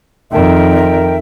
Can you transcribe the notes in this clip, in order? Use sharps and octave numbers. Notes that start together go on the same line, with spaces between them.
F2 D#3 A#4 E5 G5